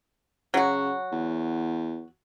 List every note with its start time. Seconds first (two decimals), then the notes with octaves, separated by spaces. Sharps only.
0.54 C#3 F#3 F#4
1.12 E2